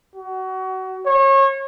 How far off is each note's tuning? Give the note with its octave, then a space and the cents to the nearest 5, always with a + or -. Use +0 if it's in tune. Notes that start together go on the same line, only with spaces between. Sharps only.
F#4 +25
C#5 -30